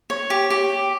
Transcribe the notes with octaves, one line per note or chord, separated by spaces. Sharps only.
C#5
G4
G4